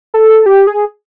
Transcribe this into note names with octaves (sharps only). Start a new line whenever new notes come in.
A4
G4
G#4